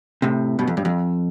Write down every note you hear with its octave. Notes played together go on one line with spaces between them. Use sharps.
A2 C3
G2 B2
F2
G2
F2